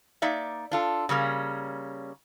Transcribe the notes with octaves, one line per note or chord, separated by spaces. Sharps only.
A#3 D#4 D5 E5
D4 F4 A4
C#3 G3 A#3 C#4